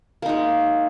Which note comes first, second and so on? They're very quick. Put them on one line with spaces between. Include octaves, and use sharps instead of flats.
A#3 D#4 G#3